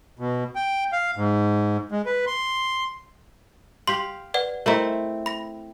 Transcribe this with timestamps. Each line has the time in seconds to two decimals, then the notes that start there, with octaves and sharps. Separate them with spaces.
0.19 B2
0.55 G5
0.93 F5
1.16 G#2
1.92 G#3
2.06 B4
2.27 C6
3.88 G4 F5 C6
4.34 B4 D5 F#5
4.66 A3 C4 E4 A#4 D#5 A#5
5.26 B5 A#6